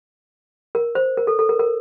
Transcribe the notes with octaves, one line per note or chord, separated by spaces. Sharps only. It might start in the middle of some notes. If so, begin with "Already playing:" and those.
A#4
C5
A#4
A4
A4
A#4
A#4